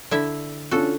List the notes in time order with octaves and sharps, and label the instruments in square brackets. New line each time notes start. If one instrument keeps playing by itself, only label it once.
[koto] D3 E4 E5
[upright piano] C#4 D4 F4 [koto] F#4 A4